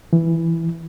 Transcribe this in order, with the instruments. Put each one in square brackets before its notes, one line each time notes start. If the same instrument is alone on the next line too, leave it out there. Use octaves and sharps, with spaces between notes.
[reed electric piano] E3